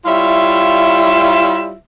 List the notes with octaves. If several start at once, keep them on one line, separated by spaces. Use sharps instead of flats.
G3 E4 F4 C#5 E5 F5